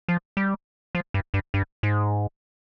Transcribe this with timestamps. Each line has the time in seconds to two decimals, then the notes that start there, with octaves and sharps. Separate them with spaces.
0.08 F3
0.37 G3
0.95 F3
1.14 G2
1.34 G2
1.54 G2
1.83 G#2